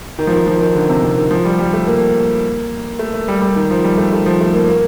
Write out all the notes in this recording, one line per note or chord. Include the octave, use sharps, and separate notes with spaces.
D#3
F3
D#3
F3
D#3
D3
C3
C3
D#3
F3
G3
G3
A3
A#3
A3
A3
G3
G3
D#3
F3
G3
A3
A3
F3
A3
A#3
A#3